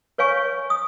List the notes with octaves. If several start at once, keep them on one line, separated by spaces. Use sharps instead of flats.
B4 C#5 F5 G#5 C#6
D#6